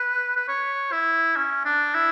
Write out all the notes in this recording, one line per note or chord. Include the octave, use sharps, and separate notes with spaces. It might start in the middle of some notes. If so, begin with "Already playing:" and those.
Already playing: B4
B4
C#5
E4
C#4
D4
E4